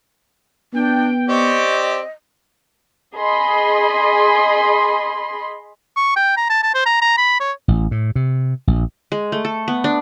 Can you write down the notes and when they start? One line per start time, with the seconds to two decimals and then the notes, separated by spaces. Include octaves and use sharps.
0.74 B3 D4 G5
1.29 C4 G4 D5 D#5 C#6
3.15 G#4 D#5 B5 C6
5.96 C#6
6.16 G5
6.37 A#5
6.50 A5
6.63 A5
6.74 C5
6.86 A#5
7.02 A#5
7.17 B5
7.40 C#5
7.68 A1
7.91 A2
8.16 C3
8.67 A#1
9.12 G#3
9.32 A3
9.45 A4
9.68 B3
9.84 D4